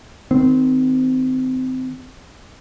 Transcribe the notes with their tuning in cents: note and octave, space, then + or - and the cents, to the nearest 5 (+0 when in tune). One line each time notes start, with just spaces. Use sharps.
D#3 +0 C4 -25